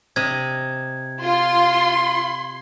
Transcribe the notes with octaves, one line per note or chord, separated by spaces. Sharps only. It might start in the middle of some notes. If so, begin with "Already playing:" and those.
C3 D#5 G#6
F4 C6